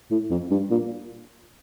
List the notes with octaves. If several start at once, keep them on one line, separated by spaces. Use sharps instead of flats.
A2
F2
G2
A#2